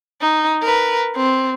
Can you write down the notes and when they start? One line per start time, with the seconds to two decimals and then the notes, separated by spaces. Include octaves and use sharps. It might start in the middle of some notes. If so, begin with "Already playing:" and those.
0.21 D#4
0.62 A#4 B4
1.16 C4